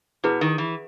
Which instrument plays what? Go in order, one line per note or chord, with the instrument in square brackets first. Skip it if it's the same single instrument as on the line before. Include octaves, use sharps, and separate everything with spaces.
[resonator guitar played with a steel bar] B2 [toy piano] E4 G#4 B4
[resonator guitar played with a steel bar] D#3
E3